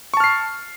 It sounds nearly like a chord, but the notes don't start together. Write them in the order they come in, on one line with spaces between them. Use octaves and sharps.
C#6 A5 F6 C7